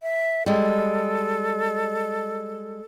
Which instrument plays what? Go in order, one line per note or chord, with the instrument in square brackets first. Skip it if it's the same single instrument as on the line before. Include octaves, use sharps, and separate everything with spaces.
[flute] E5
[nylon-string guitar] G3 G#3 [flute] A4